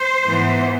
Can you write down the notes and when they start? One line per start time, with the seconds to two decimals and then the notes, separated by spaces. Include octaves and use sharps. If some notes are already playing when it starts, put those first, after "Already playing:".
Already playing: C5
0.24 G#2 E3 B3